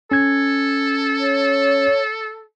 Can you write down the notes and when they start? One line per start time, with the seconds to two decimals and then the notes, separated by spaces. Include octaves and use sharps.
0.11 C#4 A4 G#6
1.19 C#5